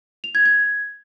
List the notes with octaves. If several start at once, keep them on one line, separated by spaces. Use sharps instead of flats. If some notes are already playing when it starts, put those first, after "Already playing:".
F7
G#6
G#6